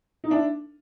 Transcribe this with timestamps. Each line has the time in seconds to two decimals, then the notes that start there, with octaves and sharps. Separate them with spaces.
0.24 D#4
0.31 D4 E4